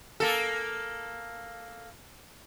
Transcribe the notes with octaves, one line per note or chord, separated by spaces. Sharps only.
A#3 A4